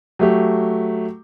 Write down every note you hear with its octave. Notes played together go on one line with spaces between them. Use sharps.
F#3 A3 G4